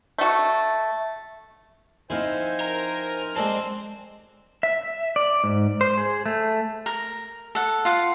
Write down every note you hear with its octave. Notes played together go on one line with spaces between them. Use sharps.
A3 F#4
F3 C4 D#4 E4 C5 F5 G#5
A#4
G#3 C4 D4 A4 C5
E5
D5
G#2
C5
G#4
A3
A#4
A4 F#5
F4 F5 F#5